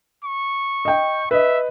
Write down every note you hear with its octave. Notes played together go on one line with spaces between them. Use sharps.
C#6
D#5 G5
B4 D#5 E5